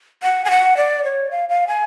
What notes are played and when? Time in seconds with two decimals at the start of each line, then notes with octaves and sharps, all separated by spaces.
0.23 F#5
0.45 G#5
0.50 F#5
0.77 D5
1.04 C#5
1.31 F5
1.49 F5
1.68 G#5